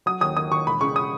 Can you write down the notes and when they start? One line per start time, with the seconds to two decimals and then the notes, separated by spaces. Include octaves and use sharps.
0.06 F#3 D#6
0.21 D#2 D#6
0.37 D#3 D#6
0.51 D#2 C#6
0.67 E1 B5
0.81 C#3 C#6
0.96 D#6